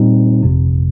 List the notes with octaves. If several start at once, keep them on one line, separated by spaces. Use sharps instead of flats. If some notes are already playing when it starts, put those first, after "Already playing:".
Already playing: A#2 G3 C4 D#4
G1 F2 C3